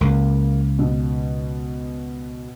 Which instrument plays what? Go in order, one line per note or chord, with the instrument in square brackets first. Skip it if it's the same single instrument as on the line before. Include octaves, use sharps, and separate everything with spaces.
[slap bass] C#2 [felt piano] A#3
[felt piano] B2